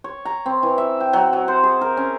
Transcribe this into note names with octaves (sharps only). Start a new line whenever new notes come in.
C#5
A#5
C4
E3
E5
G5
F#3
F#3
C5
G#4
A#4
C#4